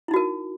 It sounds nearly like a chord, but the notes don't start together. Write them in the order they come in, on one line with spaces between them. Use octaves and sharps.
E4 D#4 F#4 A#4